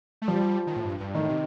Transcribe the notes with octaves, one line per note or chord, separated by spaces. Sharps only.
A3
F3 G3
D#3
A2
G2
G2
A2 D#3
C3